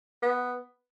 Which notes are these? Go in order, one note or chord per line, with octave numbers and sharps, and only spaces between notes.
B3